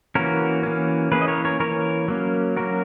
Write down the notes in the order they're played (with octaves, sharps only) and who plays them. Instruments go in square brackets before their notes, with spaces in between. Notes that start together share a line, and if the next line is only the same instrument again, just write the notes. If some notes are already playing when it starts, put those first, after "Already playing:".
[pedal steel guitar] E3 A#3 C#4 F#4 A#4
E3 A#3 C#4
E3 A#3 C#4 G#4 B4
D#5
A#4 C#5
A#4 C#5
E3 A#3 C#4 A#4 C#5
F#3 A#3 C#4
F#3 A#3 C#4 F#4 A#4